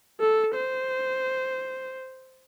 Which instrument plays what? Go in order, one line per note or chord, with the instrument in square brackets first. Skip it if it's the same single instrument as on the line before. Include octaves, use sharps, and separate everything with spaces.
[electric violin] A4
C5